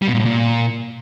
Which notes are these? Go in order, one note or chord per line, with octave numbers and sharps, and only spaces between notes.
G3
B2
A#2
A2
A#2